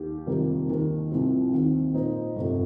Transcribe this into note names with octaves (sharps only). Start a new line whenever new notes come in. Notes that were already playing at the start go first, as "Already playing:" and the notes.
Already playing: D#2 G4
F2 C3 D#3 G3 A#3
D#2 D#3 A#3
C2 C3 F3 C4
D#2 D#3 C4
A#2 A#3 D#4 C5
G1 F2 C3